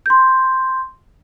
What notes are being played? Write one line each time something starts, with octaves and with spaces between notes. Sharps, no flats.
C6 G6